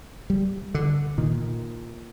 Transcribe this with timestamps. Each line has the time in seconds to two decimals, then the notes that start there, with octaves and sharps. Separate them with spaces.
0.30 G3
0.75 D3
1.18 A#2 D#3